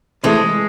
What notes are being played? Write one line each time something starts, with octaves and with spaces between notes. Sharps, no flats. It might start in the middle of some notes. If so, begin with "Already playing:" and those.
C3 E3 G#3 A3